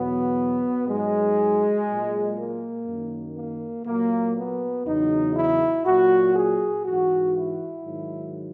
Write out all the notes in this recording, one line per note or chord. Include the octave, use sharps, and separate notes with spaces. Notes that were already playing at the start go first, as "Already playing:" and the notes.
Already playing: E2 B2 F#3 B3
G#2 F#3 G#3
A#2 F#3
A#3
F#2 D#3 F#3
A#3
A#2 F#3 A#3
B3
E2 C#3 F#3 D#4
E4
A#2 F#3 F#4
G#4
G#2 E3 F#4
E4
G#2 D#3 F#3